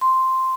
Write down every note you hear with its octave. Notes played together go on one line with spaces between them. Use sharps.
C6